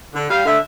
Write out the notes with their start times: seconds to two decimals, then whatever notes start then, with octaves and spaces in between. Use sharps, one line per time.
0.14 D3
0.29 G3 F5
0.45 D3 E5